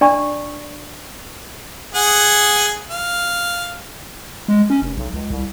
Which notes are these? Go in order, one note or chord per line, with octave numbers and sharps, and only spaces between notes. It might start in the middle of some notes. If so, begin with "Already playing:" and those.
D4 D5 A5 A#5 C#6
G#4 F#5 G#5
F5
G#3
C#4
F1
B1
C#2
C2